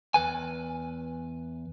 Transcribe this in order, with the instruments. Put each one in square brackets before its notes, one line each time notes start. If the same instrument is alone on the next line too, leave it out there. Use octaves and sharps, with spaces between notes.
[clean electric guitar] E2 B4 G#5